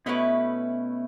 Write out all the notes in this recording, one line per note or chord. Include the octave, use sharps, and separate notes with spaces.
B2 A3 C#4 E4 B4